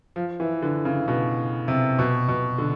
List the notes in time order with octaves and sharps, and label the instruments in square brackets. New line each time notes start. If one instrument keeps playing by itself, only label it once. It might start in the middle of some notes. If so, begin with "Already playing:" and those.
[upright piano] F3
E3
D3
C#3
B2
C3
B2
B2
D3